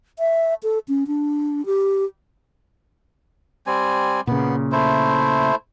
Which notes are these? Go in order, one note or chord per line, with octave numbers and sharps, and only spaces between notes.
E5
A4
C#4
D4
G4
G3 C4 G#5
A#2 C#3 B3
A3 E4 C5